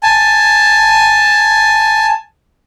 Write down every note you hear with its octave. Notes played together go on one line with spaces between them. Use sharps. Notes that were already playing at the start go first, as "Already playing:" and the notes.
G#5 A5